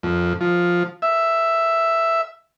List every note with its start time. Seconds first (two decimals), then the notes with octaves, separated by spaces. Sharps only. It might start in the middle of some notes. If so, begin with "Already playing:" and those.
0.03 F2
0.41 F3
1.02 E5